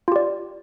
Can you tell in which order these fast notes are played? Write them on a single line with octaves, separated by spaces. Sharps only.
F4 G4 D5